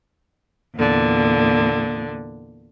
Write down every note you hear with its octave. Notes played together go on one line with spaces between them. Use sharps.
E2 A#2 D3